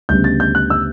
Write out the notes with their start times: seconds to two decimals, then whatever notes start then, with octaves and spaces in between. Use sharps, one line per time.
0.09 D2 C#3 G3 B3 G6
0.24 A6
0.40 G6
0.55 F#6
0.70 E6